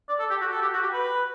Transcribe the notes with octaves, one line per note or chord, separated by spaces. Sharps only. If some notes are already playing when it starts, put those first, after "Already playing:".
D5
A4
G4
F#4
A4
G4
F#4
G4
B4